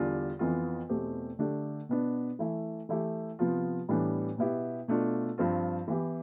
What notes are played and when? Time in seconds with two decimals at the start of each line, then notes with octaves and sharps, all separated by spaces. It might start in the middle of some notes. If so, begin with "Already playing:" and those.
Already playing: E2 D3 G3 D4 F4
0.39 F2 E3 B3 F4
0.89 E2 B2 A3 C4 G4
1.39 D3 A3 D4 G4
1.89 B2 B3 D4
2.39 E3 A3 E4
2.89 E3 A3 E4 G4
3.39 C3 F3 B3 F4
3.89 A2 E3 G3 B3 D4
4.38 B2 B3 E4 G4
4.88 B2 A3 D4 F4
5.38 G2 F3 C4 F4
5.88 E3 B3 E4 G4